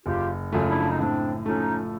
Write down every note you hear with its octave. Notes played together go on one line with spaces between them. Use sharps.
F#1 F4 G4
F#2 C#3 F3 A3
D4 E4
D#4
A2 C4 D4
F3 A3 C#4 D#4